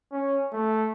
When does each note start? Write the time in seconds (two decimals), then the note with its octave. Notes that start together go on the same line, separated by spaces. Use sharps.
0.12 C#4
0.53 A3